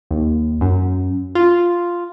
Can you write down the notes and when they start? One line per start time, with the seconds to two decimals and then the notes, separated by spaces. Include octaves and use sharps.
0.11 D#2
0.61 F#2
1.35 F4